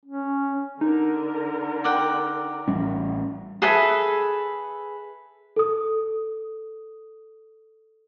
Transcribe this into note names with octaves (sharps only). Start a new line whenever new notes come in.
C#4
D3 D#4 A#4
D5 F#5 G5
A1 G3 C#4
G#4 A4 B4 E5
A4 D#6